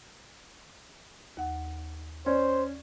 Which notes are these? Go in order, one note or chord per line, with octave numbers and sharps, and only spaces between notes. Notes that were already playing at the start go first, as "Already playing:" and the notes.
D#2 F#5
C#4 C5 D5